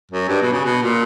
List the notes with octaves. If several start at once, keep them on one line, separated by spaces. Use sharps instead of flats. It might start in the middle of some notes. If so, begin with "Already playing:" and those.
F#2
G2
B2
C#3
B2
A#2